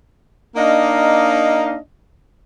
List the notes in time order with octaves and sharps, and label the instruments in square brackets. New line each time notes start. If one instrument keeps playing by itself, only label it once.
[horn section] A#3 D4 D#4 D#5 F5